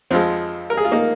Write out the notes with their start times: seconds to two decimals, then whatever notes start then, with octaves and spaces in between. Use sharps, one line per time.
0.11 F2 F3 G#3 C4
0.70 A#4
0.77 G#4
0.85 F4
0.92 A#3 D#4